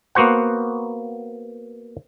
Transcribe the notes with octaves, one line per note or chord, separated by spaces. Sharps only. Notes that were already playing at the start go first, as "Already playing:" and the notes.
A#3 B3 F#4 C5 F#5